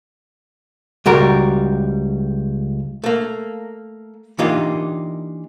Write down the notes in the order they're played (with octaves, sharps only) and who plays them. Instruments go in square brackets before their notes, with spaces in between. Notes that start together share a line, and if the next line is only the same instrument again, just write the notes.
[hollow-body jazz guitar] C#2 G3 F#4 A#4
A3 A#3
E3 A#3 D4 D#4 F4 G4